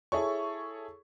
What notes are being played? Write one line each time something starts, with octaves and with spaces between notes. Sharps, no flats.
E4 G#4 A4 C#5 C#6